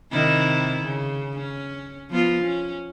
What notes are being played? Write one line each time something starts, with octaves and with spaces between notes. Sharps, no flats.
C3 D#3 E4
C#3
C#4
F3 B3 F4
C#4